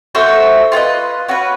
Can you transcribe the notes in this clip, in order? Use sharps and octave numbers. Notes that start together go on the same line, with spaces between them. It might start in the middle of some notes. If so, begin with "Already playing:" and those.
F#4 A4 C5 E5
F4 G#4 B4 D#5
C#4 F#4 B4